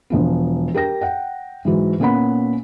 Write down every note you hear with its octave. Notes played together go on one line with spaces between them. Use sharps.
E1 F3 B3
G4 A#4 G5 A#6
F#5 G5
G#2 E3 F#3 G#3
A#2 B3 C#4 A#4 F#5 B5